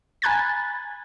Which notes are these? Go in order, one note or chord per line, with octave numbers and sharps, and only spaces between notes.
G#5 A#5 B5 F#6 G#6 A6